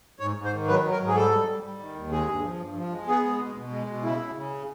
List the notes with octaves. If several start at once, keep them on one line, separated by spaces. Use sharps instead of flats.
G#2 C#5
G#2
C5
D#3
F#3 B4
F#3
A#4
G#2
G#4
G3 A4
G3
G3
G3
D#3
D#2
G#3 G#4
G2
F3
G2
F3
G#3
B3 G#4
G#3
B2
B2
G#3
B2
C#3 E4
C#3
C#3